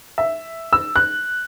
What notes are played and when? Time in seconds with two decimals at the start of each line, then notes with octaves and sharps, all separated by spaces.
0.18 E5
0.73 E6
0.96 F#6